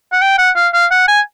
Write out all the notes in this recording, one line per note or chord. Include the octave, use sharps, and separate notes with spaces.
F#5
G5
F#5
F5
F5
F#5
G#5